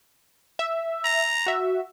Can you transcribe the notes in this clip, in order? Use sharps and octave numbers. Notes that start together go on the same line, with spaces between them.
E5
A#5
F#4 E5